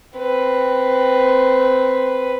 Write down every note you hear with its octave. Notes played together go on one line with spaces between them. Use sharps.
C4 B4